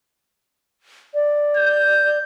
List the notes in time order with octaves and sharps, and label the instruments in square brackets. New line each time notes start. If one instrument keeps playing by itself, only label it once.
[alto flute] D5
[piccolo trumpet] G6